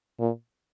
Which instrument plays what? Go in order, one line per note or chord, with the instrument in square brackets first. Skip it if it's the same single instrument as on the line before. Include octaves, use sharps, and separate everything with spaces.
[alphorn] A#2